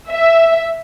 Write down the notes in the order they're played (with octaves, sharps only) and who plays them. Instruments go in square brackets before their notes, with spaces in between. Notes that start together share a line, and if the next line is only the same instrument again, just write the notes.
[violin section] E5